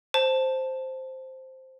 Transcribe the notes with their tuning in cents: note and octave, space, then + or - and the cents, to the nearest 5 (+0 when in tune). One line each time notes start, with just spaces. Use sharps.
C5 +0 A5 +5